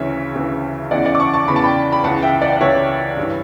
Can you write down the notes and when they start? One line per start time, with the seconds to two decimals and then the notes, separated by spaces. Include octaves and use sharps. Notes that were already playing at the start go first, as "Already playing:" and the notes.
Already playing: D2 C#3 E3 C#5 E5
0.35 D2 C#3 E3
0.91 E2 C#3 E3 D5 F#5
1.05 D5 F#5
1.15 D6
1.20 A5 C#6
1.34 A5 C#6
1.48 E2 C#3 E3 B5
1.56 A5
1.64 G5 B5
1.92 B5
2.04 C#2 C#3 E3 F#5 A5
2.22 E5 G5
2.42 D5 F#5
2.61 C#2 C#3 E3 C#5 E5
3.17 G2 E3